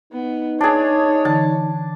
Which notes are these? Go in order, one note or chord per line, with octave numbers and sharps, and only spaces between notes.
B3 D#4
D4 G#4 C#5
D3 E3 A5